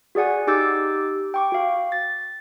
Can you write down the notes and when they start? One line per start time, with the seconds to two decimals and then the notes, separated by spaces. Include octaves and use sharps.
0.15 F#4 G#4 D5 F#5 G#5
0.47 D#4 G4 D6 E6 G6 A6
1.34 G5 C#6 D6
1.52 F#4 F5
1.92 A6